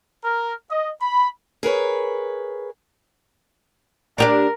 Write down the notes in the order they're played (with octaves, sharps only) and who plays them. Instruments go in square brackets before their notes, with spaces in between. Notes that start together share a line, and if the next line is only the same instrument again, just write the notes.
[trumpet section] A#4
D#5
B5
[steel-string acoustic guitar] G#4 A#4 B4 C#5
[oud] D4 G4 D5 [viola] A#4